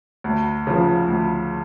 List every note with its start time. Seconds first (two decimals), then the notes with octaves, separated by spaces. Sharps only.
0.24 D2
0.67 C#3 F3
1.08 D2